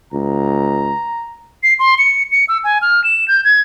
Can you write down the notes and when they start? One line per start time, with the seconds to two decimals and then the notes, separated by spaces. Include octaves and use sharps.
0.13 C#2 A#5
1.63 C7
1.79 C6
1.98 C#7
2.32 C#7
2.48 E6
2.64 G#5
2.82 F6
3.04 E7
3.28 G6
3.44 G#6